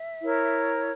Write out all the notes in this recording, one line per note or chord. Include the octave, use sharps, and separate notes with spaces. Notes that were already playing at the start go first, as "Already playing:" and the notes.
Already playing: E5
E4 A#4 C#5